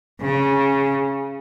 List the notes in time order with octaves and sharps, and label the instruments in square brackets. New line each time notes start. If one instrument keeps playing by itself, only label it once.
[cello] C#3